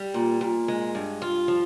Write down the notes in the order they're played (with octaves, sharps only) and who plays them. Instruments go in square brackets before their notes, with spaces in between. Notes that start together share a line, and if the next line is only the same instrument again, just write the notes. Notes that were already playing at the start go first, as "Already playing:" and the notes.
Already playing: [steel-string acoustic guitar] G3
A#2
A#2
G#3
G2
F4
F3